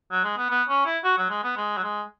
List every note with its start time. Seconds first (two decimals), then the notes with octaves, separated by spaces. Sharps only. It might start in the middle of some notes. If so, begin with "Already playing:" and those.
0.11 F#3
0.24 G#3
0.37 B3
0.50 B3
0.69 C#4
0.86 E4
1.04 F#4
1.17 F#3
1.30 G#3
1.43 B3
1.57 G#3
1.77 F#3
1.84 G#3